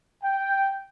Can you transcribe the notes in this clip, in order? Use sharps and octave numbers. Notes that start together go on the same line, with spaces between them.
G5